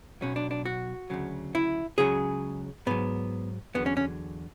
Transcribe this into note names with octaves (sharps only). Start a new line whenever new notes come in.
B1 B2 F#3 C#4
D4
D4
F#4
D2 C#3 F#3
E4
C#2 C#3 F#3 G#4
G#2 F#3 B3
E2 D3 F#3 B3
C#4
C#4